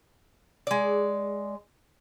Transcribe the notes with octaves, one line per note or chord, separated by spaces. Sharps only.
G#3 D5